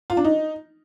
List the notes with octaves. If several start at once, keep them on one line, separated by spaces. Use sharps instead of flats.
F4
D4
D#4